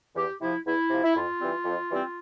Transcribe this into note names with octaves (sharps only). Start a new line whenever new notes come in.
E2 G4
C3 F3 E4
E2 E4
C3 F3
E4
F2 F4
E3 G3 C4
F2
E3 G3 C4